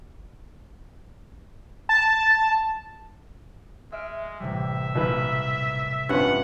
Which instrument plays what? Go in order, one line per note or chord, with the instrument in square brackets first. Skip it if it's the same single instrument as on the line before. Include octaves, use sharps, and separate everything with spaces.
[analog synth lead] A5
[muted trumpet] G#3 [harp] E5 F6 D7
[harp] A1 C3 G3 [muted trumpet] E5
[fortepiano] B1 A#2 B4
[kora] G2 F3 [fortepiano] C3 C#4 [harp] E4 [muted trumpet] F#5